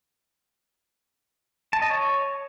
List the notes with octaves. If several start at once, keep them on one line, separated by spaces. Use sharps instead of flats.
A5
D#5
C#5